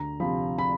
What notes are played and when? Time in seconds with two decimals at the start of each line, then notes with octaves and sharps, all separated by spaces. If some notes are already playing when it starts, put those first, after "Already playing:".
Already playing: D2 A#5
0.20 C3 F3 B5
0.58 B5